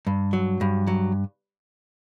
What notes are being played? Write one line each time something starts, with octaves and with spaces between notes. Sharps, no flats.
G2
F#3
G2
F#3